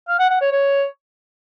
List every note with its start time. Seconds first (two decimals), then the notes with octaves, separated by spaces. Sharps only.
0.08 F5
0.19 F#5
0.30 F#5
0.41 C#5
0.52 C#5